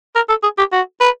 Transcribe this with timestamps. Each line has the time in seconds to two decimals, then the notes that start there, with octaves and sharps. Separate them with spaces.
0.15 A#4
0.29 A4
0.43 G#4
0.58 G4
0.72 F#4
1.00 B4